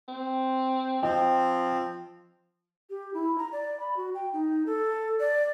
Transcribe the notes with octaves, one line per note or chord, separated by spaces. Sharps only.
C4
F3 C4 D#5 G5
G4
E4
A#5
D5
B5
F#4
G5
D#4
A4
D5